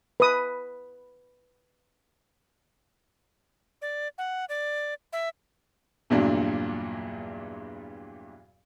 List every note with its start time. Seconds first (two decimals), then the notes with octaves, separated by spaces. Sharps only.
0.20 B4 D#6
3.82 D5
4.18 F#5
4.49 D5
5.13 E5
6.10 E2 G2 A#2 F#3 D4